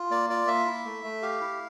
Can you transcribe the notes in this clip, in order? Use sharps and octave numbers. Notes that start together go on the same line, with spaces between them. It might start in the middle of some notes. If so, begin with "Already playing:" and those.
Already playing: F4
A#3 D5
F4 D5
A#3 E5
E4
A3
A3
G4 F5
E4